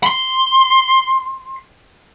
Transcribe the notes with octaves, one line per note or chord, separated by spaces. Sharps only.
B5 C6